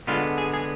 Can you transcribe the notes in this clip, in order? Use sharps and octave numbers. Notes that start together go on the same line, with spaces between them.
D3 G#3 B3 F4
G#4
G#4